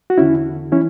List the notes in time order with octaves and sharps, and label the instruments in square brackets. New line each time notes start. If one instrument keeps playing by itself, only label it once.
[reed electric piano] F#4
E2 D3 C#4 E4
E3 C#4 E4